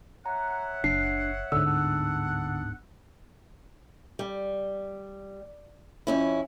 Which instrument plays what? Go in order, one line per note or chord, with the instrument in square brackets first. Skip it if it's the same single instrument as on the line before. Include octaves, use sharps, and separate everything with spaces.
[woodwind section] C#5 E5 F#5 [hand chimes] A#5
[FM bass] F#1 [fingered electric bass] D4 [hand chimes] C7
[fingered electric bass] D1 G#2 [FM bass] D3 [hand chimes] E6
[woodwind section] B3 D4 F#5
[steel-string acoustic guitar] G3
F2 C#4 E4